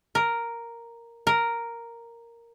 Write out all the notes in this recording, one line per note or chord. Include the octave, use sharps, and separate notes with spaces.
A#4
A#4